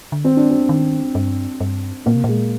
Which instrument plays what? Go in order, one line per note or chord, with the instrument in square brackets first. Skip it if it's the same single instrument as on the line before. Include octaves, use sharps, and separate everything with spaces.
[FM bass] D3
[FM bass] D#3 [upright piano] C4
[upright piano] D4
C4
[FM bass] D#3
G2
G2
[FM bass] A#2 [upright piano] A#3
[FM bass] C3
[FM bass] A#2 [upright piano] G#3